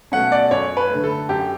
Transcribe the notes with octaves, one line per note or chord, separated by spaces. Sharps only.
B2 A3 C#4 F#5
D5
F#2 C#5
B4
D3 A3
A4
F#2 G4